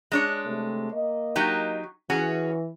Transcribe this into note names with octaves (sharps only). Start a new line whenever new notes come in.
G#3 D4 C#5
C3 A3
A#3 D#5
F#3 D#4 G4
E3 C#4 F#4 G#4